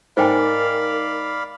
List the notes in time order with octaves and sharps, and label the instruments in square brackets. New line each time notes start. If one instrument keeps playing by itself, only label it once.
[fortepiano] G#2 [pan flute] A#4 [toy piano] C5 G5 G#5 [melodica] D5 F5 B5